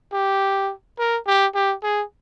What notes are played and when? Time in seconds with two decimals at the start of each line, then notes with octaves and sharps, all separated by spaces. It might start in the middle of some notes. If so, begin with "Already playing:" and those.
0.13 G4
0.98 A#4
1.27 G4
1.55 G4
1.83 G#4